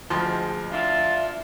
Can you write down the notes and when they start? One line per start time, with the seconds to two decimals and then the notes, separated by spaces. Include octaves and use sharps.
0.10 D2 F3 G#3 C6
0.71 D4 E4 F4 E5 A5